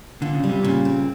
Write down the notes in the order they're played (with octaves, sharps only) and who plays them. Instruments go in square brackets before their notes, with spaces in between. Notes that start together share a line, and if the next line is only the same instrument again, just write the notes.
[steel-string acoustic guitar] A#2 [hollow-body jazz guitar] D3
[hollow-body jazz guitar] C#3
[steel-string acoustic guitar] G3
[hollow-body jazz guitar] C3
[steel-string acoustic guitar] A#2 [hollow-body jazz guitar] C#3
[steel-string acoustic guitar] C4